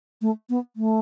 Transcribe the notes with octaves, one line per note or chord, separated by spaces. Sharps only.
A3
B3
A3